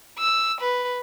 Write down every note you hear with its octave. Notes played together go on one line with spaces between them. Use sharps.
E6
B4